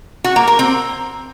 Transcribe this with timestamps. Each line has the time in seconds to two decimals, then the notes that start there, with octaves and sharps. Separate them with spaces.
0.24 F#4
0.36 A#3
0.47 A#4
0.59 C4